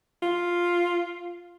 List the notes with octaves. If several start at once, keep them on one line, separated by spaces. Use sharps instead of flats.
F4